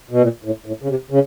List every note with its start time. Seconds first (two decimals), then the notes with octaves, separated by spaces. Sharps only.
0.11 B2
0.22 A#2
0.44 A2
0.66 A2
0.82 C#3
0.89 C3
1.10 C#3